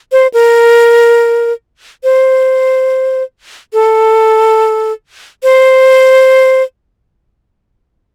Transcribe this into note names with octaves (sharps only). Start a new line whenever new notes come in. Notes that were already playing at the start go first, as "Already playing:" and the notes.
C5
A#4
C5
A4
C5